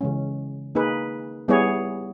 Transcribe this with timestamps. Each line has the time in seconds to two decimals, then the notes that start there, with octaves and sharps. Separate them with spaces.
0.01 C#3 E3 G#3 C#4
0.75 A#3 D#4 G#4 B4
1.48 G3 B3 E4 G#4 C#5